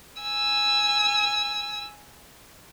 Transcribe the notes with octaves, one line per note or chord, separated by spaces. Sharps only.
G#5 E6